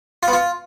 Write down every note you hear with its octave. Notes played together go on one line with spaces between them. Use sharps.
F4
B3
F4